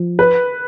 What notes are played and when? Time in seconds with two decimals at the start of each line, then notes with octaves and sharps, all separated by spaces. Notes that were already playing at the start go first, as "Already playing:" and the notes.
Already playing: F3
0.19 B4